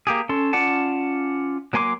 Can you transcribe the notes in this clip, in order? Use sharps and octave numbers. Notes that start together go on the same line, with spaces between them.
A#3 G4 G#4
C#4 A4 C6
C#4 F4 D5 F#5 A5
F#3 A#3 G#5 C6 D6